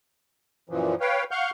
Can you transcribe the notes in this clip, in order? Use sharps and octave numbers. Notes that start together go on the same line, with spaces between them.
F#2 A#2 E3 F3
B4 C#5 F5 G5
F5 F#5 C#6 F6 G6